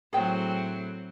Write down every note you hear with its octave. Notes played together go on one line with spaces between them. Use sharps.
A2 F#3 C4 G#4 G5